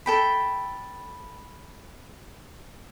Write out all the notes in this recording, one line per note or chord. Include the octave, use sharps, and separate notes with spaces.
A4 G5 B5